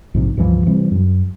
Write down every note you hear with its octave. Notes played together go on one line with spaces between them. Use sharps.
A#1 G#2 C3
C#2 G2 E3 F3
C3 E3 G3 C4
F#2